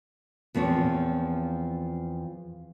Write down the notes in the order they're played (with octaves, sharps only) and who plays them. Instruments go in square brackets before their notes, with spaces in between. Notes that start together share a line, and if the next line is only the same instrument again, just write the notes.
[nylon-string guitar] E2 F3 C4 C#5